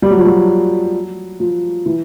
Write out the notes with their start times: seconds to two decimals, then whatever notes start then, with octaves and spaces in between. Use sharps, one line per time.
0.02 G3
0.11 F#3
0.17 F3
0.26 F#3
1.40 F3
1.86 E3